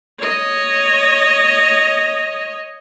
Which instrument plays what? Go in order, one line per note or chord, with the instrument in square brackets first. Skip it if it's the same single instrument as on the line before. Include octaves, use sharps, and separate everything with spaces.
[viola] C#5 D#5